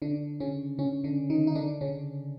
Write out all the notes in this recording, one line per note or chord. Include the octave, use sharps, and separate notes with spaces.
D3 D4
C#3 C#4
C#3 C#4
D3 D4
D#3 D#4
D#4
D3 D4
C#3 C#4